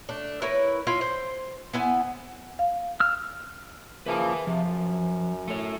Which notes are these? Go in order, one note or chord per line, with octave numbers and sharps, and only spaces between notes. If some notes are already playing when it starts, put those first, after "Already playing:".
A3 D4
E4 A#4 B4 C#5
E4 F4 E5
C5
B3 E4 G#5
F5
E6 F6
C#3 F3 A#3 B4 E5 G#5
C3 F3
F#2
A3 C#5